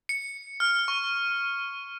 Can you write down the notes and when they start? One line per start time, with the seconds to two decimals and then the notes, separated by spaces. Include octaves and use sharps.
0.09 C#7
0.60 F6
0.88 C#6